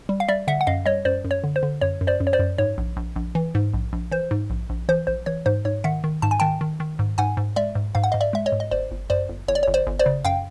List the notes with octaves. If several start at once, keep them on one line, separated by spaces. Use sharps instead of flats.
G3
F5
G3 D5 E5
D3 E5 F#5
F#5
F#2 D#5 F5
G3 C#5 D#5
F#2 C5 D5
F#2
C#5
D3
C5
D3
F#2 C#5
F#2
C5 D5
F#2
C#5
C5 D5
F#2
G#2 C#5
A#1
A#1
A#1
E3
G#2
A#1
A#1
E3 C5
G#2
A#1
A#1
E3 C5
A#1 C5
E3 C#5
G#2 C5
G#2 C#5
D#3 E5 F#5
D#3
G#2 A5
G#5
D#3 G5 A5
D#3
D#3
G#2
G#2 F#5 G#5
G#2
G#3 D5 E5
G#2
G#2 F5
F#5
G#2 D#5 F5
D5 E5
G#3 E5
C#5 D#5
G#2
D#5
G1 C5 D5
G1
F#2 C5 D5
G1
G1 C#5
D5
C#5
G1
C5 D5
G1
C5 D5
C#3
F#2 F5 G5